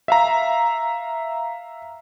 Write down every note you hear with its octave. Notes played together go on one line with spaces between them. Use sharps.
E5 F5 A#5